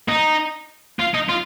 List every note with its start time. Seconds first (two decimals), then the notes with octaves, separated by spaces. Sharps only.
0.09 D#4
0.99 F4
1.14 D#4
1.29 F4